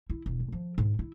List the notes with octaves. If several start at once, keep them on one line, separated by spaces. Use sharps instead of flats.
E4
E1
A1
F3
G#2
E4